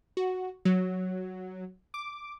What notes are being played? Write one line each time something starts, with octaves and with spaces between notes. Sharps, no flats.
F#4
F#3
D6